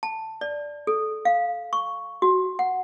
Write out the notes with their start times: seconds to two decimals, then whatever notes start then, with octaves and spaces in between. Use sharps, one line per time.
0.03 A5
0.41 D5
0.87 A4
1.25 F5
1.73 C#6
2.22 F#4
2.59 F#5